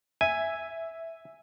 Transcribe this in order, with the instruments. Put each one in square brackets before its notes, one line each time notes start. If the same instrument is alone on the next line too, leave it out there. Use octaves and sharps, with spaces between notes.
[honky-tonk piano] E5 [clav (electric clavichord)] G#5